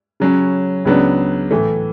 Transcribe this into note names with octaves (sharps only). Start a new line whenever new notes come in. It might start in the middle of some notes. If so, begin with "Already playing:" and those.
C#3 F#3 C#4
C#2 C#3 F#3 B3 D4
A2 E3 A3